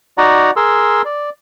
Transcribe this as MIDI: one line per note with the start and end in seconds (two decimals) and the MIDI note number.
0.18 0.51 63
0.18 0.51 66
0.18 0.51 74
0.18 0.51 78
0.18 0.51 82
0.56 1.02 68
0.56 1.02 70
0.56 1.02 84
0.56 1.02 88
1.05 1.30 74